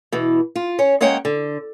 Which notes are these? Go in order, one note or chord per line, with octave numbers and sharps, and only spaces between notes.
B2 E3
F4
C#4 C#5
G#3 A#3 C#4 C#5 F#5 G5
D3